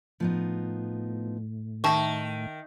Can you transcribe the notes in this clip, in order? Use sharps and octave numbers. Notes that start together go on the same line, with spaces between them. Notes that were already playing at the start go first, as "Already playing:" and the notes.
A2 F3 B3 D#4
D#3 E5 A5 C#6